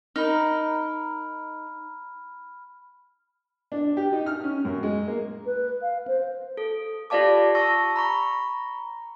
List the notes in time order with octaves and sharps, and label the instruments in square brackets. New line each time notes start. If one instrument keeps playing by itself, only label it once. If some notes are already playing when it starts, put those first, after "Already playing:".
[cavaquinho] D#4 A#4 [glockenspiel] B5 F6
[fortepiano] D4
G4
D#4
F6
C#4
F#2
G#3
A#3
[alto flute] B4
F5
C5
[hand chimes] A4
F4 G4 D5 F5 A5 D6
A5 C#6 E6 A#6
A#5 B5 C#6